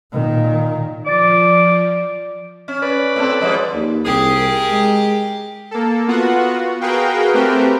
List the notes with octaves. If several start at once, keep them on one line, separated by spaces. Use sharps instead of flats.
A#2 D#3
F3 D5 D6 A6
C#4
B4 D5
A2 C4 A4
F3 G#3
D#2
C2 G4 G#4 A#4
G#3
A#3 A4
B3 F4 F#4 F#5
F#4 G#4 A#4 B4 F5 G5
A3 C4 G4 A#4 B4